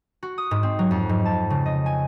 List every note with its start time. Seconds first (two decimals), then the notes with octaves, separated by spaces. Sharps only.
0.23 F#4
0.38 D#6
0.51 G#2
0.63 C4
0.79 F#3
0.91 F2
1.09 G#2
1.26 A5
1.50 C#3
1.66 D#5
1.86 G#5